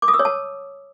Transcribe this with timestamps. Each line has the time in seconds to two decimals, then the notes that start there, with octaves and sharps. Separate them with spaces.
0.02 D6
0.08 D#6
0.14 E6
0.19 C#5
0.25 A5